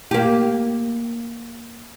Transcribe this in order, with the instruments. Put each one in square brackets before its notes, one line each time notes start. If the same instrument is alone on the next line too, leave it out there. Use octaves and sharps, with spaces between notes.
[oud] A#3 G4